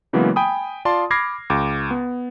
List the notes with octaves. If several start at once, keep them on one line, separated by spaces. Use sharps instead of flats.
C#3 E3 F#3 G#3 A#3 B3
G5 G#5 B5 D#6
F4 D5 A5 C6
B5 D6 F6 G#6 A#6 C7
C#2 D6
B3